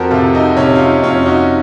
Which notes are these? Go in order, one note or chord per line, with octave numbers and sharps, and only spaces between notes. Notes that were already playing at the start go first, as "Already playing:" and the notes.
Already playing: F2 F#4 A4 A#4 C5
C3 F4 A4
D#4 F#4
C3 C#4
F4
D#4
F2 C#4 F4
D#4 F#4